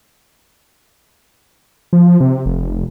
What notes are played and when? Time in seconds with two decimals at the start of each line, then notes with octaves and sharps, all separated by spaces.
1.93 F3
2.20 C3
2.46 F1